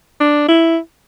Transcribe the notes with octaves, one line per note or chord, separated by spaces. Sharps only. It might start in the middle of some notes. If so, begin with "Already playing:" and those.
D4
E4